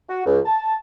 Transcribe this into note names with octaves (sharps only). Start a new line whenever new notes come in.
F#4
C#2
A5